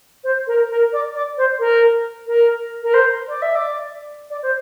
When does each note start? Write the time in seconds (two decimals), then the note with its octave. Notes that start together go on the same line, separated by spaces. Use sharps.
0.23 C5
0.47 A#4
0.69 A#4
0.92 D5
1.14 D5
1.37 C5
1.59 A#4
2.27 A#4
2.82 A#4
2.93 C5
3.28 D5
3.42 E5
3.55 D5
4.30 D5
4.42 C5